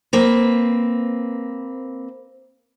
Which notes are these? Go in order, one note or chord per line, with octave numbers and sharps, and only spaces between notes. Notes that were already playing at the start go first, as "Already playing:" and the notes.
A#3 C4 B4